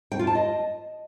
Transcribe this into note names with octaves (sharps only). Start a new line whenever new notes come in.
G5
F4
A5
D#5